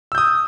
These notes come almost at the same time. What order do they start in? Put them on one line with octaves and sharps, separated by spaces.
E6 G6 D#6